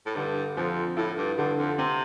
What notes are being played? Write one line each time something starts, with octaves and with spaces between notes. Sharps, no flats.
A2
G2 D3
F2 F3
A2 E4
G2
G2 D3
F2
C3 C4